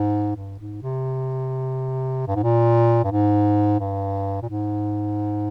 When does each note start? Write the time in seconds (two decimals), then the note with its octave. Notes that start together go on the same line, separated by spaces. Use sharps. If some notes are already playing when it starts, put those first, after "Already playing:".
Already playing: G#2
0.36 G2
0.59 G#2
0.82 C3
2.27 G2
2.35 G#2
2.43 A#2
3.04 G2
3.11 G#2
3.80 G2
4.42 A#2
4.49 G#2